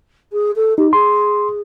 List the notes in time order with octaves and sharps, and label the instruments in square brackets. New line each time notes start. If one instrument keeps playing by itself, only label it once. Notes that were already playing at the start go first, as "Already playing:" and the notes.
[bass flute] G#4
A4
[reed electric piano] D#4 [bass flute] G4
[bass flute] G#4 [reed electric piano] C6